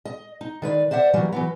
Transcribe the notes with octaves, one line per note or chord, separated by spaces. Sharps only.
D#5
D#4
D#3 B4 C#5 D5
C5 D5 E5 F#5
E3 F#3 G3 A#3
E3 F#3 B3